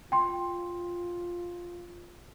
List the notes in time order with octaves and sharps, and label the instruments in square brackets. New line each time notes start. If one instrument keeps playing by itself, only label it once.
[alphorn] F4 [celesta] G5 C6